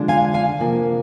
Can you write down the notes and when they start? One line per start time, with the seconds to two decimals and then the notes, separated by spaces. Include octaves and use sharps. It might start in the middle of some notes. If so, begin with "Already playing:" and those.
Already playing: D3 F3 G#3 D4
0.08 F5 G#5
0.34 F5 G#5
0.60 C3 F3 A#3